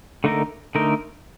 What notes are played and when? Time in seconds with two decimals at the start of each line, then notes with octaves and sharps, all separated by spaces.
0.24 D3 A3 D#4 A#4
0.75 D3 A3 D#4 A#4